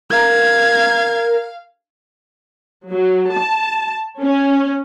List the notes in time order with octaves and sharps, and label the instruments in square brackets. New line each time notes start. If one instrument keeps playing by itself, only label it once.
[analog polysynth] A#4 [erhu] F5 [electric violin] G#6
[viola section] F#3
A5
C#4